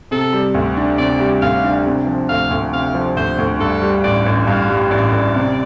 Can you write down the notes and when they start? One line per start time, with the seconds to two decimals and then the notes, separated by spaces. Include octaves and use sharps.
0.11 C3 A4
0.33 G3
0.54 D2
0.77 D4
0.98 C3 D5
1.20 G3
1.42 D2 F5
1.64 D4
1.86 C3
2.07 F3
2.29 D2 F5
2.51 D2
2.73 C3 F5
2.95 F3
3.16 D2 C5
3.38 D2
3.59 G2 A4
3.81 G3
4.04 A1 D5
4.26 A1
4.47 G2 F5
4.69 G3
4.91 A1 D5
5.12 A1
5.34 C3